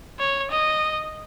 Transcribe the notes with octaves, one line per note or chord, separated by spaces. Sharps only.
C#5
D#5